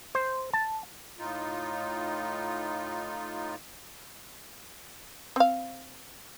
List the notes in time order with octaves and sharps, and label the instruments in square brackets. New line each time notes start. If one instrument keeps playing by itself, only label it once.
[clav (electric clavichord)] C5
A5
[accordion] A2 D#4 F4
[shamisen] C4 F5